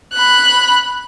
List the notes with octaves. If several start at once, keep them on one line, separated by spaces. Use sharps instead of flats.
B5 F#6